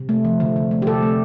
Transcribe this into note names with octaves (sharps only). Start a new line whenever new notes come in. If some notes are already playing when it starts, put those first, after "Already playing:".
Already playing: C3
A3
F3
D3
D3
A3
G4
C3 A4
A3